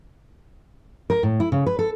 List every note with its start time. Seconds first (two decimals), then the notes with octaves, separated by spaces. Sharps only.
1.10 A#4
1.23 A2
1.40 E4
1.52 C#3
1.66 B4
1.79 A4